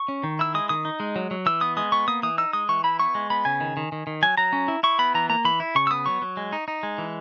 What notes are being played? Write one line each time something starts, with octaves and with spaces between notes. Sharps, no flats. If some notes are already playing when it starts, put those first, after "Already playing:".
Already playing: C#6
C#4
D#3
E4 E6
G#3 D#6
D#3 D#6
D#4
G#3
F#3
F#3
E3 E6
B3 D#6
G#3 D#6
B3 C#6
A#3 D#6
E3 D#6
D#4 E6
G#3 D#6
E3 C#6
E4 B5
B3 C#6
G#3
B3 B5
C#3 G#5
D#3
D#3
D#3
D#3
F#3 G#5
F#3 A#5
C#4
E4
E4 C#6
B3 B5
E3 A#5
A#3 A#5
E3 B5
E4
C#3 C#6
E6
B3 D#6
F#3 C#6
F#3
G#3
D#4
D#4
G#3
E3